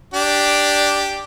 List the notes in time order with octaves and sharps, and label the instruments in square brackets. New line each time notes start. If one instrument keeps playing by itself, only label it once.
[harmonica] D4 G4